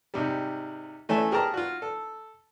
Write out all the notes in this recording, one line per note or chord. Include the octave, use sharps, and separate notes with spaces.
G#2 C3 G3
E3 A3 C#4 G#5 A5
G4 G#4 A#4 A5 A#5 F6
F4 F#4
A4